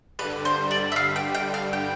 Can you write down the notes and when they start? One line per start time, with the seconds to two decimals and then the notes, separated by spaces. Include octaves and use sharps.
0.19 G2 D3 G3 B4
0.45 C5
0.71 D5
0.92 E5
0.96 F5
1.16 G5
1.35 G5
1.54 F5
1.73 G5